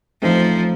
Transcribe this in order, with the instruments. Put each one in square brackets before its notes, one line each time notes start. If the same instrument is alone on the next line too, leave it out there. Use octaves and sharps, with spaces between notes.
[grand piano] A1 A2 A3 C4 D#4 [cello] F3